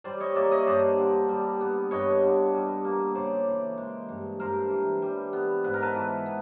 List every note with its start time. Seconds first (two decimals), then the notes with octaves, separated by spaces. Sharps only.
0.04 G3 C5 D5
0.20 C#5 D#5
0.36 A#3 D5 E5
0.51 C#5 D#5
0.67 G2 C5 D5
0.98 D3
1.29 G3
1.60 B3
1.91 G2 C#5 D#5
2.22 D3
2.54 G3
2.85 A#3
3.15 C#3 C5 D5
3.47 E3
3.78 G#3
4.09 G2
4.40 G2 A#4 C5
4.71 E3
5.02 G3
5.33 B3
5.64 G#2 B4
5.74 A#4
5.82 A4 B4
5.95 E3
6.26 B3